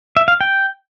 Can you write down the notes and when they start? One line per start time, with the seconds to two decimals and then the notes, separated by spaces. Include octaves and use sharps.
0.17 E5
0.28 F5
0.41 G5